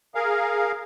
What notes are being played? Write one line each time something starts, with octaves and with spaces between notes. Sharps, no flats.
G#4 A#4 F5